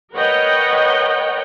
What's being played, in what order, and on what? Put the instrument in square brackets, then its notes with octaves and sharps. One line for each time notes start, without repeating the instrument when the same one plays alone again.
[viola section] A#4 B4 C#5 D#5 F#5 G5